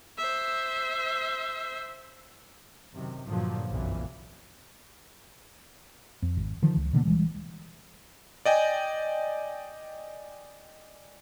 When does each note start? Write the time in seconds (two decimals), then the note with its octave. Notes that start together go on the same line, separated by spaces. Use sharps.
0.17 C5 E5
2.93 F#2 C3 D#3
3.27 G2 A#2 D3 F3 F#3
3.70 F#1 B1 F2 A#2 E3
6.22 F2
6.37 G#1
6.62 D3 D#3 F3
6.76 C#2
6.93 B2 D3 G#3 A#3
7.05 D1 E3 G3 G#3
8.45 D5 D#5 G5 G#5